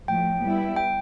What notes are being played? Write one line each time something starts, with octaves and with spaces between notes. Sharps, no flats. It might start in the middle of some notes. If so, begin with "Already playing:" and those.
A2 F3 A3 G5
G3 B3 E4
G5